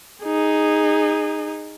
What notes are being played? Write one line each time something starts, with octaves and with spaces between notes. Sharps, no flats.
D#4 G#4